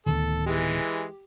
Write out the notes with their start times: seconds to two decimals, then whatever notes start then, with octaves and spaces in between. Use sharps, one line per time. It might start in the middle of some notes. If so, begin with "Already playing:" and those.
0.06 D1 D2 D#3 B3 A4
0.46 E3 G#3 G4